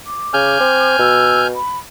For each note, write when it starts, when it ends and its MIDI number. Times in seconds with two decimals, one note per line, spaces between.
0.06 0.96 86
0.34 0.56 49
0.34 1.47 80
0.34 1.47 89
0.34 1.47 91
0.60 0.94 60
0.99 1.56 47
0.99 1.40 88
1.54 1.77 83